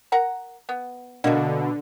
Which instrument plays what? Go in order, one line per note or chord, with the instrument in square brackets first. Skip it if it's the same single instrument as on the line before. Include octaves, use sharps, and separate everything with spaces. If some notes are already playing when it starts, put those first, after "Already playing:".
[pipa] A#4 F#5 A#5
B3
[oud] B2 F#4 [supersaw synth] D3 [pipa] A#3